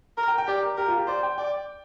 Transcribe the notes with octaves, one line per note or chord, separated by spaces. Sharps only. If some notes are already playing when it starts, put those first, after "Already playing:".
A#4 A#5
G5
G5
G4 D5
A#4
G4 A#4
F4
G4
C5 D5
G5
D5 G5